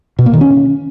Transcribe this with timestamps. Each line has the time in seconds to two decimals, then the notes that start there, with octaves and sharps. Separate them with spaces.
0.19 B2
0.26 A#3
0.34 D#3
0.41 C#4